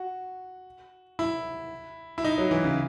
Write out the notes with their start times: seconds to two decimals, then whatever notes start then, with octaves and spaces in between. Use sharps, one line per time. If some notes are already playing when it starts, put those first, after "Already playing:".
Already playing: F#4
1.19 E4
2.18 E4
2.25 D#4
2.38 F#3
2.51 E3
2.64 C#3